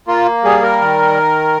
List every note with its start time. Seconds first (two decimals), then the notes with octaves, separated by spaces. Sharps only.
0.07 A#3 F4
0.44 G3 G#4
0.62 A#4
0.81 D#3